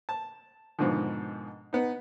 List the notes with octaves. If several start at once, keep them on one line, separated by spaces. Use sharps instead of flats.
A5
G#2 B2 D3 D#3 F3
B3 D#4